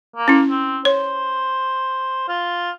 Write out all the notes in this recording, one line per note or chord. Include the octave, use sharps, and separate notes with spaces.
A#3
C#4 E4
C4
C5 C#5
F4